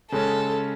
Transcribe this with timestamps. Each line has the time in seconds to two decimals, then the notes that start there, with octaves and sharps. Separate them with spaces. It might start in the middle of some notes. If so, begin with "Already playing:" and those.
0.12 C#3 G#3 C#4 A4